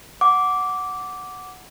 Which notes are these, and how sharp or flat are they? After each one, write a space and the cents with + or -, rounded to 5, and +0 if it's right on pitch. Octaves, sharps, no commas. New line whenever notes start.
F#5 +0 D6 -10